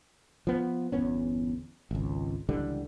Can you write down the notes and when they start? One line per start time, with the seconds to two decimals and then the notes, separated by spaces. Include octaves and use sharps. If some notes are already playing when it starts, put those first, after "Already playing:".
0.47 F3 B3
0.92 G1 E2 B3 C#4
1.91 G#1 C#2
2.49 C#2 D3 E3 G3